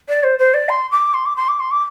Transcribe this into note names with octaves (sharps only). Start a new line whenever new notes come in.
D5
C5
C5
D5
C6
D6
C6
D6
C6
D6
C6
D6